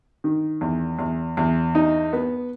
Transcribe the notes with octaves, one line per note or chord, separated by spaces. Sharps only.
D#3
E2
E2
E2
D#4
B3